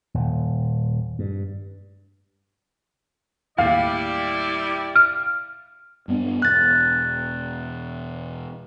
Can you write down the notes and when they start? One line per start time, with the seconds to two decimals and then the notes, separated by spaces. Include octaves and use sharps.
0.14 D#1
1.19 G2
3.58 D#2 A2 G3 A#3 E4 D5 F5
4.96 F6
6.08 G2 B3 D4
6.42 E1 F#6 A6